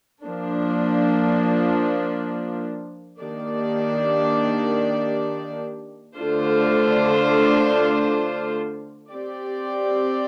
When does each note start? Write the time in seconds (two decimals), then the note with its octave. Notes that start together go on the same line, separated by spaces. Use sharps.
0.24 F3 A#3 D4
3.20 D#3 A#3 D4 G4 D5
6.15 D3 A3 D4 F4 C5
9.10 C4 G4 D5